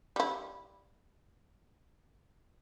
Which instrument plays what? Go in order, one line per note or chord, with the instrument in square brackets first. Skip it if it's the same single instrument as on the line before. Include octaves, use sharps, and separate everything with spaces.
[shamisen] G3 E4